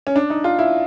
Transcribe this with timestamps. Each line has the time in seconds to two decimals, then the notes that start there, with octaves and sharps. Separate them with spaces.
0.07 C#4
0.16 D4
0.30 D#4
0.44 F4
0.59 E4